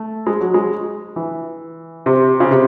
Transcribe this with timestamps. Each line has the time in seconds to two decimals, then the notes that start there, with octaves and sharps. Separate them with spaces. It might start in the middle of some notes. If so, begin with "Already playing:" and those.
Already playing: A3
0.27 G#3
0.41 F#3
0.54 G#3
1.16 E3
2.06 C3
2.40 C#3
2.51 C3